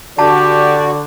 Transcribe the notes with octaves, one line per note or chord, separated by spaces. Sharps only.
D3 F#4 G4 D5 A5